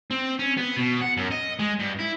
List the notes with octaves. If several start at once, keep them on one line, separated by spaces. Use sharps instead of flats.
C4
C#4
B3
B2
F#5
F#2
D#5
G#3
G2
E4